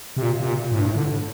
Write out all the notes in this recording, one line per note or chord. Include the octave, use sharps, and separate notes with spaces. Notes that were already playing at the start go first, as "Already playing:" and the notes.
C3
A#2
C3
A#2
A2
G2
A2
D3